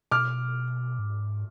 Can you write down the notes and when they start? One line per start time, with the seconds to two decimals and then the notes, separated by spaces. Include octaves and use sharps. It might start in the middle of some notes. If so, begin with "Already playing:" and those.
0.11 B2 D6 F6
0.99 G#2